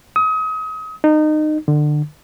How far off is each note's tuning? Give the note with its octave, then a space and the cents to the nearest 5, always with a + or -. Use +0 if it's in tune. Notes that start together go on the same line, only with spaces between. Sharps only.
D#6 +35
D#4 -25
D3 +25